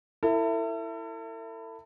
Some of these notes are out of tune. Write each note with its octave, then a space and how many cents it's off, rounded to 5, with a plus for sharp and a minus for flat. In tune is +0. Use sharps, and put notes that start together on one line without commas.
E4 +10 A4 +40 E5 -5